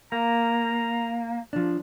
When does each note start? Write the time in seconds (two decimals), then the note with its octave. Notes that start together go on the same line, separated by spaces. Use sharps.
0.12 A#3 A#5
1.53 F3 D4